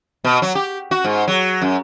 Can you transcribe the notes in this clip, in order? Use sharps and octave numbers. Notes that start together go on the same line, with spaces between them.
B2
F#3
G4
F#4
G#2
F#3
F#2